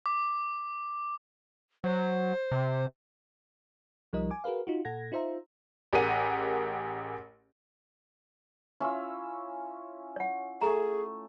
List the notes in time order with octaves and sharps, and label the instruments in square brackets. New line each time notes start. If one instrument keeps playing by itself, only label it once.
[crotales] D6
[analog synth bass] F#3 [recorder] C5
[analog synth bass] C3
[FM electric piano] C2 F3 G3 D#4 A#4 D#5
G#5 D6
F#4 G#4 A#4 B4 F5
D#4 F4 F#4
A#2 A4 F#5 G#6 A#6
D#4 F4 C5 E5 A#5
[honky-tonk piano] A1 G4 G#4 A#4 F#5 D#7
[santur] C#4 E6 [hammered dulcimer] E4 F4
[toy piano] C#5 F#5
[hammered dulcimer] A3 [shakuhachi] G#4 [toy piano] A#5